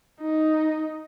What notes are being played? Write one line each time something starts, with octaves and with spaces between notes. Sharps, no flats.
D#4